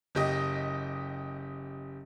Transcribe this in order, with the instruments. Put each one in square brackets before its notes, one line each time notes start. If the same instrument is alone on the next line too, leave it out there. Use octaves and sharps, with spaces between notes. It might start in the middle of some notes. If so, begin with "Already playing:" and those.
[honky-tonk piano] F#1 G4 D#5